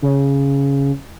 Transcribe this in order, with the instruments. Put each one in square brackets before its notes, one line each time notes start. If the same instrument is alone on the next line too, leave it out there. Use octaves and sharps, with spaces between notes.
[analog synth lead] C#3